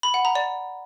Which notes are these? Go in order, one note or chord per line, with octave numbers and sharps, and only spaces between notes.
B5
F#5
A#5
D5